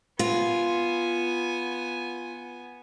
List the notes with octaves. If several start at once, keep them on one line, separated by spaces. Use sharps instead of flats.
B3 F4 G#5